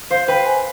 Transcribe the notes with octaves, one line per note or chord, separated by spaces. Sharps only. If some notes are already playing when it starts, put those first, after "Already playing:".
C5 F5
B4 G5
G#5